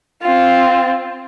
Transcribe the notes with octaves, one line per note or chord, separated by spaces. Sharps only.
C4 F4